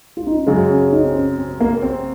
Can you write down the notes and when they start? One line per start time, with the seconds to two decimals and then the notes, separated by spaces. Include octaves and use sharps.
0.17 F4
0.27 D#4
0.36 C#4
0.46 F#2 C#3 G#3 C4
0.69 C#4
0.92 D#4
1.04 C4
1.15 C#4
1.38 C4
1.60 A#3
1.82 C4